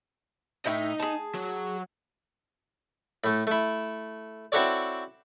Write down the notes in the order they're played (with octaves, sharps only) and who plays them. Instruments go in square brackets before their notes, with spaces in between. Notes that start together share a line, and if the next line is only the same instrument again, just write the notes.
[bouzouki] A2 E5 G5 [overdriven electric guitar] D#4 D#5
[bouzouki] G#4 A5
[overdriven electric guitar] F#3
[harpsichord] A2 A3
A3 E4
C4 E4 F#4 A4 C#5 D5